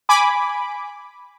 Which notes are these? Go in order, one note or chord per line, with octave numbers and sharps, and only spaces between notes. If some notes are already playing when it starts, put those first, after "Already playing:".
G#5 B5 D6